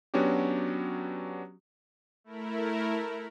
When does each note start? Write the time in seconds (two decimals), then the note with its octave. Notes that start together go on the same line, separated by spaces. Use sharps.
0.14 F#3 B3 C#4 D4 F#4 G4
2.24 A3 E4 A#4